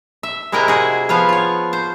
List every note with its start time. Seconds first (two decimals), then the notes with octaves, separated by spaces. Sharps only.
0.23 E5
0.52 C3 G#3 E4 A#4 D#5 G5
0.68 F#4 G#4
1.09 F3 B3 C#5 F5
1.29 F4 C#5
1.73 C5